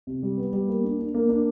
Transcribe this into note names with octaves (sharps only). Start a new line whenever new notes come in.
C3
G3
B3
G3
A#3
D4
D4
A#3
D4